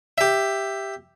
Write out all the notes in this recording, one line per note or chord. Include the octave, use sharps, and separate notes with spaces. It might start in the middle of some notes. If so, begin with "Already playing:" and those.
G4 E5